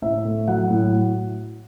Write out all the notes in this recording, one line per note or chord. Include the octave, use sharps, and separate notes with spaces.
A2 E5
A3
F#3 F#5
A2